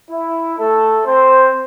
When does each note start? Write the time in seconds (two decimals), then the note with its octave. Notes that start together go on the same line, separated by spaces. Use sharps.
0.10 E4
0.58 A3 A4
1.05 C4 C5